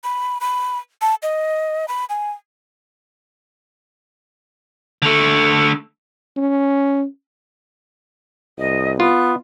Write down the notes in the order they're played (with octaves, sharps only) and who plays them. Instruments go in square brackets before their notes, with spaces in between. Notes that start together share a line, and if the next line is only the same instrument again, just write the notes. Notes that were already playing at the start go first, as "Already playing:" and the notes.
[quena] B5
B5
A5
D#5
B5
G#5
[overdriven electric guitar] D3 A3
[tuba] C#4
[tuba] C2 [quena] D#5
[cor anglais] B3 [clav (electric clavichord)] F4 [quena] F#6